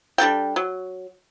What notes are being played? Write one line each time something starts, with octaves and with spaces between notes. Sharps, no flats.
G3 D4 A4 G5
F#3